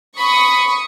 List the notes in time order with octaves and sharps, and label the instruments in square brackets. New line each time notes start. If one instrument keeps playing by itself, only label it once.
[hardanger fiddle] B5 [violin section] C#6 D#6